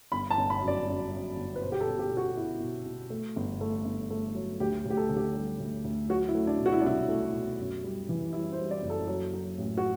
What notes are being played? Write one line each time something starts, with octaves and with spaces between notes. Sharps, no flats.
G1 B5
A5
G1
B5
F#2
D5
F#2
F#2
G1
B4
B2 C5
G4
A4
B2
G4
B2
F#4
B2 E4
B2
B2
A3
G1
A3
G1
A3
F#3
D2 G4
D2
G4
A4
D3 A4
G4
G3
D2
D2
F#3 F#4
E4
A3
D4
B2
F#4
E4
D4
C2 E4
A3
B2
F#2
G3
E3
G3 E4
C5
G3
D5
F#1
A4
F#3
F#3
A1
F#4